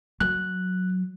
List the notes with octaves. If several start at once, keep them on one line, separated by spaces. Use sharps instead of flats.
F#3 F#6